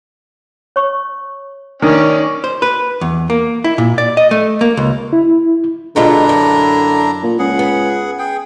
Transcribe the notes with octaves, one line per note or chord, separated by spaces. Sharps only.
C#5 C#6
D#3 C#4 D5
C5
B4
E2
A#3
E4
A#2
D5
D#5
A3
A#3
C#2
E4
B2 D3 G#3 D4 E4 F4 A#5
F#2
A#2
C#2 G#4 F#5
B3
G#4 G5